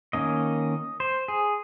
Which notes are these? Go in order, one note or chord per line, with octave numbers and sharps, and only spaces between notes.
D#3 A#3 C#4 D#5
C5
G#4